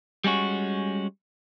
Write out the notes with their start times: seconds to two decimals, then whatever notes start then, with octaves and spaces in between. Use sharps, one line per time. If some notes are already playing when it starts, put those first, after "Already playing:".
0.24 G3 G#3 C#4 F#4